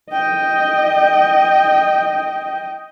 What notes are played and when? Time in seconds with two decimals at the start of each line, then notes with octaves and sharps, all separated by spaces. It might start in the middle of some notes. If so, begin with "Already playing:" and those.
0.11 D#5 G5